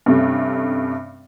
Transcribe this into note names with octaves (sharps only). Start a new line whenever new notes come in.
G2 C3 A3 C#4